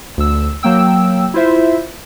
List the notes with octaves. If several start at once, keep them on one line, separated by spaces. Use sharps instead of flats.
D2 E6
F#3 A#3 G5 E6
E4 F4 C5 E5